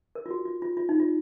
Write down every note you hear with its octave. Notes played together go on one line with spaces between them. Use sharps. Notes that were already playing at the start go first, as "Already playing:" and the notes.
A#4
F4
F#4
F4
F4
F4
D#4
F4